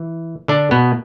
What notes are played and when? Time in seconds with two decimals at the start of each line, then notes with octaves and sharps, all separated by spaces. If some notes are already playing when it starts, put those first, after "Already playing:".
Already playing: E3
0.48 D3 D4
0.71 B2 B3